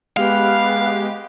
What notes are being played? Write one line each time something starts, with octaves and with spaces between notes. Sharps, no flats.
G#3 B3 G4 F5